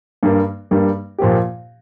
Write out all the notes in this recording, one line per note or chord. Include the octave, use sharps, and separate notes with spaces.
G2 G3 A#3
G2 G3 A#3
A#2 F3 A#3 G4